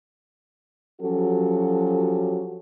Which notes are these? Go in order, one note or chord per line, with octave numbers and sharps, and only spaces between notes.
F3 F#3 C#4 F#4 G4 A4